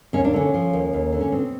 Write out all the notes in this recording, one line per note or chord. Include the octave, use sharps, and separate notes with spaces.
D#2 C#4
D4
D3 C#4
F3
D#2
D#2
D3
C#4
B2 C4